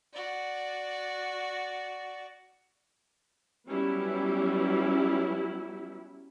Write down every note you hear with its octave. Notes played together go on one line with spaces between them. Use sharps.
F#4 D5
F#3 G3 B3 C#4 E4 G4